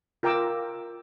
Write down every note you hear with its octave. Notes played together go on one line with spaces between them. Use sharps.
F4 A#4 G5 A#5 D6 E6